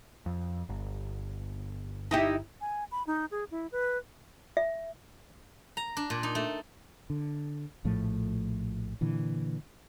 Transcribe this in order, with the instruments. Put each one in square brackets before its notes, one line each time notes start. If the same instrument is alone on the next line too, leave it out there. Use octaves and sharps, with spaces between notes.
[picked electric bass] F2
G1
[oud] D#4 E4 G4
[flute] G#5
B5
D#4
G#4
E4
B4
[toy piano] E5
[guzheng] A#5
D4
A#2
D#4
A3
[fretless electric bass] D3
A#1 A2 F3 A3
A#2 D3 E3